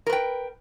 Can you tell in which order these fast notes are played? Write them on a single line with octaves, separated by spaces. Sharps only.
A#4 B4 G5